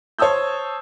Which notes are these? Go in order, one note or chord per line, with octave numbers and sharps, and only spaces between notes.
C5 C#5 A5 D#6 E6 G6